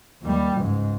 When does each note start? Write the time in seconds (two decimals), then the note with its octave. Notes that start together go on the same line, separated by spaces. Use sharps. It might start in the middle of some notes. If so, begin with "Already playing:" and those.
0.22 D#2 G3
0.57 C#2 G#2